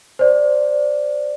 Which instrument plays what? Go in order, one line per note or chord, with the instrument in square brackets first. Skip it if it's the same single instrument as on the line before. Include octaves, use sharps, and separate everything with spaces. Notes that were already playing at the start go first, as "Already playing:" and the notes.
[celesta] C5 D5